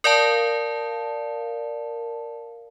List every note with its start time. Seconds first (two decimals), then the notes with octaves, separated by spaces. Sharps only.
0.04 A#4 D5 F5 A5